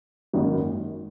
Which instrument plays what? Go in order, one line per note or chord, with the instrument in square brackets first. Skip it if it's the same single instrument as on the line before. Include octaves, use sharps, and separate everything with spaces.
[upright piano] G#1 F#2 D#3 A#3